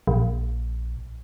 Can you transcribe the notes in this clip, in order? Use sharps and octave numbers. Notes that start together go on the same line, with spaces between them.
A#1